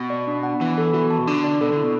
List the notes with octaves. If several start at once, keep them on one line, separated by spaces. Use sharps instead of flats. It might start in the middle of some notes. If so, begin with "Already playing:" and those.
Already playing: B2
D5
D4
F#5
E3 B3
A4
E3 F#4
A5
B2
D3 D4
D5
B2 A4
D3 E4
B2